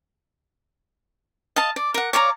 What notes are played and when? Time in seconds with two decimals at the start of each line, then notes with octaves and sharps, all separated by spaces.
1.56 D#5 F5 A5
1.76 D5
1.94 A#4 F#5
2.13 C#5 D5 F5 A#5